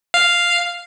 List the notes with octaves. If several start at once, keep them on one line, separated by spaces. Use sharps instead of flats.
F5